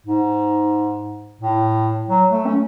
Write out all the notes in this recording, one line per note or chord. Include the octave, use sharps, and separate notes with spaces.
G#2
A2
F#3
A3
C#4